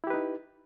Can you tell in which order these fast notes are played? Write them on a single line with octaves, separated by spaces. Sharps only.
E4 G4 B4 D#4